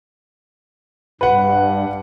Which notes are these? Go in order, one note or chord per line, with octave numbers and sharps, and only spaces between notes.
G2 B4 F#5